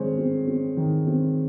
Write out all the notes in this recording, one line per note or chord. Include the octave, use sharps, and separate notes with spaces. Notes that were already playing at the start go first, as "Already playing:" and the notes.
Already playing: D#3 G#3 C4 C5 C#5
C4
C4
D#3
C4